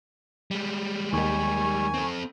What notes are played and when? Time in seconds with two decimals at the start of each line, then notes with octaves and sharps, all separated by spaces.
0.51 G3 G#3
1.13 D#2 D#3 G#5 C#6
1.94 C4 A4